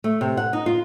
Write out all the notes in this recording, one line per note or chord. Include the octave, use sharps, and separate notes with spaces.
A3
C3
F#5
D#4
F4